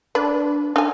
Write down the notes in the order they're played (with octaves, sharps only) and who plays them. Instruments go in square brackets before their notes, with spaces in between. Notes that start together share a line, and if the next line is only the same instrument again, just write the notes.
[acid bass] D4 [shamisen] B4
[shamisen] D4 G#5